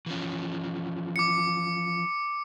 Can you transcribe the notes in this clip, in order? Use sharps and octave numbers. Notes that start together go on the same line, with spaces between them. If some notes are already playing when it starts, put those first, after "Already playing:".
E3 F3 C#4
D6 C#7